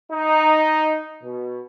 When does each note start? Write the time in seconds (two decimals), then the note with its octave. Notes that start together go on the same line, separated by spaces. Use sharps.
0.12 D#4
1.23 B2